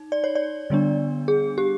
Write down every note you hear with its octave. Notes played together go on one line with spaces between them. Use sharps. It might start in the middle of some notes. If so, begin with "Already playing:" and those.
Already playing: D#4
D5
C#5
D5
D3 G3 B3 D4
G#4
G4